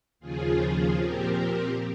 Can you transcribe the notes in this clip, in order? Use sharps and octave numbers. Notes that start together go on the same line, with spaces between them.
D#2 C#3 F3 F4 G#4
A#2 F3 C4 G4 A#4